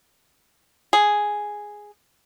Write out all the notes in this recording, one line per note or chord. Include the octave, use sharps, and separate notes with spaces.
G#4